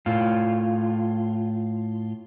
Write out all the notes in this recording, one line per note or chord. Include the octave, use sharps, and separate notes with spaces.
A2 F4